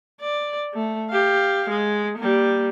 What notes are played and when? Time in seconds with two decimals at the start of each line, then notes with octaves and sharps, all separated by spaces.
0.21 D5
0.74 A3
1.10 G4 F5
1.70 G#3
2.18 G3 A#3